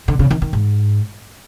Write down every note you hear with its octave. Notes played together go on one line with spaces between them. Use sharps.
D3
C#3
D#3
D#3
G#2